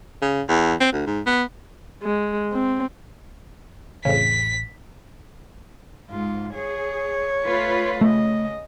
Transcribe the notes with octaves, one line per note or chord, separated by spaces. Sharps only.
C#3
E2
C4
D2
G#2
B3
G#3
C4
A1 F2 C#3 B6
G#2 F4
G#4 C#5
A3 F4 B4
C#3 A3 D#5